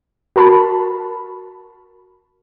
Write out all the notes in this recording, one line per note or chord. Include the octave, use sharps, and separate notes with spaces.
F#4 A#4 A5 B5